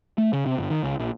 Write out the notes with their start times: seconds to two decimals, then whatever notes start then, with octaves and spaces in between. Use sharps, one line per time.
0.18 A3
0.33 C#3
0.46 C3
0.58 G1
0.70 D#3
0.83 C#2
0.99 A#1